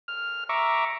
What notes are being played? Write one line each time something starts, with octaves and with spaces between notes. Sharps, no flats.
F6
E5 A#5 C#6 D6